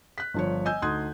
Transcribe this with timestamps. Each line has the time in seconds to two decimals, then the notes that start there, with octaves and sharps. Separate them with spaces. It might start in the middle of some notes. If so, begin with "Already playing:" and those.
0.18 F#6 B6
0.34 G1 F3 C#5
0.65 D#5 G#5 E6 G6
0.82 D2 D#4 C6 D#6 F#6 G#6